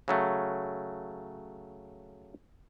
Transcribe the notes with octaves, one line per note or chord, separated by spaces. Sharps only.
C#3 F#3 A3